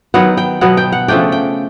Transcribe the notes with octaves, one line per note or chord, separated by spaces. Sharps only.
D#3 F#3 B3 F#5
G5
B2 F#3 B3 F#5
G5
F#5
C#3 F3 A3 D4 G5
G5